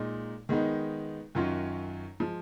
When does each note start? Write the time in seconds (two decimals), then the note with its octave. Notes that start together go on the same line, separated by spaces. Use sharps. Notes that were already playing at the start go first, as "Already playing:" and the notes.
Already playing: A#2 G#3 D#4
0.49 D#3 G#3 B3 D#4
1.35 F#2 D#3 F#3 C#4 F4
2.20 F3 G#3